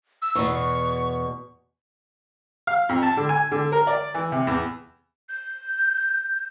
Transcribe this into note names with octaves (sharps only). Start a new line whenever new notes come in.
E6
E2 B2 C#6
F5
F2
A5
D3
G#5
D3
A#4
D5
E3
C3
E2
G6